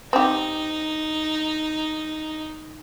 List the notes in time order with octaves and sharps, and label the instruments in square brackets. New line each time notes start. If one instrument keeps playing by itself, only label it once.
[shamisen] C4 G4 [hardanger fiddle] D#4